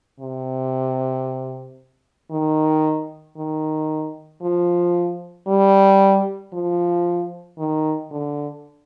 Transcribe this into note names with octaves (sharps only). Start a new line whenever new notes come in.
C3
D#3
D#3
F3
G3
F3
D#3
D3